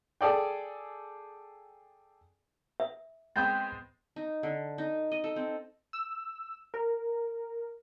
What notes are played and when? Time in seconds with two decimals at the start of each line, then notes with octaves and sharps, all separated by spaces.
0.21 G#4 A4 D5 G5
2.80 E5
3.36 G#3 B3 C4 G5 B5 D#6 G6 A6
4.16 D#4
4.43 D3
4.78 D#4
5.12 D#5
5.24 A4
5.36 C4
5.93 E6
6.74 A#4